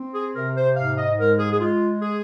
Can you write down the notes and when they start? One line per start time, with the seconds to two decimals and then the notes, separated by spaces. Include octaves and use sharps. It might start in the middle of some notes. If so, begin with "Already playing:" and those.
Already playing: C4
0.14 G#4
0.35 C3 A#4
0.56 C5
0.77 G#2 F5
0.97 D#5
1.18 G#3 A#4
1.39 G#4
1.51 G#4
1.60 G#3 F4
2.02 G#4